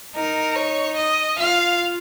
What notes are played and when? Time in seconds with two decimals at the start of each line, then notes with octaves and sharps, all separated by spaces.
0.15 D#4 A#4
0.56 C#5
0.97 D#5
1.38 F4 F5